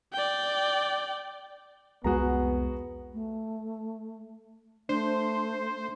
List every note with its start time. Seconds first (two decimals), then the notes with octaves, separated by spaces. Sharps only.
0.13 D5 G5
2.04 C2 F2 G#3 B3 F#4 G#4 A#5
3.14 A3
4.89 A3 D4 C5